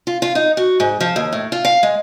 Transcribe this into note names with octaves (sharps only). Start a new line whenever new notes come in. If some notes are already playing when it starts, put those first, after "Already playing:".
F4
F4
D#4
F#4
G#2
F3
D#2
A2
F4
F5
G#3